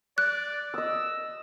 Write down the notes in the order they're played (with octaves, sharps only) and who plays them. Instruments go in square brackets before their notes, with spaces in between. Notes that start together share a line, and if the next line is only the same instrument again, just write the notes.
[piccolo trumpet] D5 [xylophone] F#6
[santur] D#5 D#6 [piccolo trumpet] E6